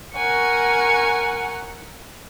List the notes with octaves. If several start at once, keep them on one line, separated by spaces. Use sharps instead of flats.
A#4 F#5 G#5 C#6